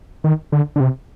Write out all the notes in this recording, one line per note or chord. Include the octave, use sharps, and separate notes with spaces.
D#3
D3
D3
C3